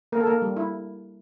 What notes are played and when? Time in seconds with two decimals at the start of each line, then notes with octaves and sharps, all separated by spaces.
0.12 A#3 A#4
0.20 A4
0.27 A#3 A#4
0.42 G3
0.57 E4